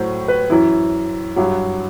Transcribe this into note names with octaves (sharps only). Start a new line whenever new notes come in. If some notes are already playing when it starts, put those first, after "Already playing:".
Already playing: A2 F#3 C5
B4
F#2 E3 E4
G2 F#3